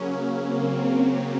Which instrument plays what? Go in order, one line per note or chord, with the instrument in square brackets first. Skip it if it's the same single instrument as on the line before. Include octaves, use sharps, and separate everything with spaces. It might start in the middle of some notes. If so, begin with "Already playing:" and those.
Already playing: [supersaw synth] C#3 F#3 C#4 [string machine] A#3
[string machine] C4
A#3